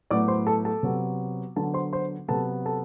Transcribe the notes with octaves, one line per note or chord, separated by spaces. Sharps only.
A2 F#3 B3 D5 D6
C5 C6
A4 A5
A4 A5
C3 F#3 B3
D3 F#3 B3 A4 A5
C5 C6
C5 C6
C3 F#3 B3 A4 A5
A4 A5